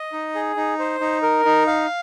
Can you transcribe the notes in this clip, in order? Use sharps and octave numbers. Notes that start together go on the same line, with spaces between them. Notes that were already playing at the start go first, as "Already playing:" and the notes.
Already playing: D#5
D#4
G#4
D#4
C5
D#4
A#4
D#4
F5